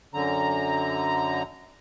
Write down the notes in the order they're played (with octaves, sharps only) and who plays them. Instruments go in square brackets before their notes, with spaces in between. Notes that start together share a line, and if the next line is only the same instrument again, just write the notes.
[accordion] F#2 D3 A#5